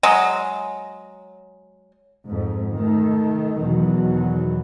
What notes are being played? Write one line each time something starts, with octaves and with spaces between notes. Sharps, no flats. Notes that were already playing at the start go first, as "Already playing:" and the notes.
F#3 G#3
F2 G#2
D#3 A3
E2 B2 D#3 E3 F#3